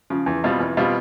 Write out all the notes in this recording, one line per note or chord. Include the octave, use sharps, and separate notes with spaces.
C#3 F3
E2
B2 G3 C4 F4
E2
B2 G3 C4 F4